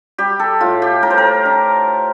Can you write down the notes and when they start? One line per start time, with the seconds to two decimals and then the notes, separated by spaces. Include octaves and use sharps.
0.18 G3 G4
0.39 A4
0.61 A2 F4
0.82 G4
1.03 A2 A#4
1.10 C5
1.18 A#4
1.45 D4